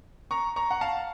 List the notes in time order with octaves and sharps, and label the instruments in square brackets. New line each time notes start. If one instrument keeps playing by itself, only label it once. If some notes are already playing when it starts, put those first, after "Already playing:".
[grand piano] A#5 C#6
A#5 C#6
F#5
F5 A5